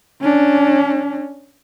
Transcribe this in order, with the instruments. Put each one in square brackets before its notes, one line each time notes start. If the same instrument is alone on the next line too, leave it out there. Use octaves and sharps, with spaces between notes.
[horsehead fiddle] C#4 D4